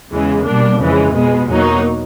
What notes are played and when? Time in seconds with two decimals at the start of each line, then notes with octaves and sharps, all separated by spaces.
0.10 E2 C#3 E3 G#3
0.44 B2 G3 A#3 D4
0.79 F2 C#3 E3 G#3
1.13 B2 G#3 B3
1.48 E2 B2 F#3 A#3 D#4